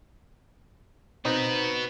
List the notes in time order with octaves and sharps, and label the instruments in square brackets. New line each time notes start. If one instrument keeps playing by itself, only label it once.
[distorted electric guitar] B3 F#4 [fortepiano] C4 D#4